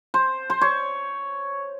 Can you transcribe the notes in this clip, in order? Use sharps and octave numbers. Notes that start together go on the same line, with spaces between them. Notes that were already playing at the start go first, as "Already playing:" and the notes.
C5
C5
C#5